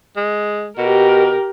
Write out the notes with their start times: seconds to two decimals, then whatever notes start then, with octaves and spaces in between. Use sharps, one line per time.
0.16 G#3
0.78 B2 G4 A#4